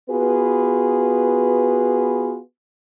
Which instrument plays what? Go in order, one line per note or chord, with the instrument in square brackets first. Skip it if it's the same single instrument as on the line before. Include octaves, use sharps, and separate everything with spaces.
[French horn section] B3 F4 F#4 G#4 B4